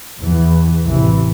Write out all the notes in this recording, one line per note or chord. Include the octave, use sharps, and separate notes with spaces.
E2 E3
A1 C3 E3